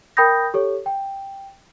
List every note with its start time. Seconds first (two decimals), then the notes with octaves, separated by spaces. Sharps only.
0.17 A#4 G5 B5 D#6 G6 A#6
0.54 G4 A4 C#5
0.86 G5